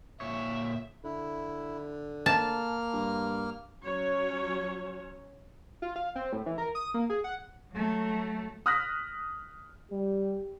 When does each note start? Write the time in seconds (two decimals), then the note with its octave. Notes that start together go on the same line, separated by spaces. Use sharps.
0.21 A#2 C#5 E5
1.04 D3 E4
2.26 A#3 A5 F6
2.94 G2
3.82 F#3 C#4 C#5
5.82 F4
5.96 F5
6.15 C4
6.33 A2
6.46 E3
6.58 A#4
6.75 D#6
6.94 A#3
7.10 G#4
7.24 F#5
7.72 F#3 A3
8.66 D#6 F6 F#6 A#6 B6
9.92 G3 G4